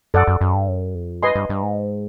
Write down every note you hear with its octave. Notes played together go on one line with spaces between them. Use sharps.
F#2 A4 D5 F#5
F#2
F#2
G2
F#2
F2
G2 B4 D#5 G#5 C6
G2
G2
G#2